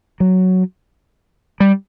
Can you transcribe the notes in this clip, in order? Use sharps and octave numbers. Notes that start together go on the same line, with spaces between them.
F#3
G3